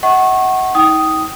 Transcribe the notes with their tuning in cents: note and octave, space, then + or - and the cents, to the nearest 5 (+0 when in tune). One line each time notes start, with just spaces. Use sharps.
D#5 +45 F#5 +20 C#6 -25
D#4 +40 G5 -25 D#6 +0